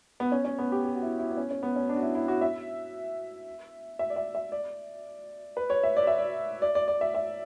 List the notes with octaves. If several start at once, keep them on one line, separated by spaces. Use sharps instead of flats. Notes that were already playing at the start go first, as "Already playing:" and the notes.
B3
C#4
C#4
B3
G4
G4
F#4
E4
E4
B3
C#4
C#4
B3
C#4
D4
F#4
E4
E4
F#4
E5
E5
D5
E5
E5
D5
B4
C#5
E5
D5
E5
D5
D5
D5
D5
E5
E5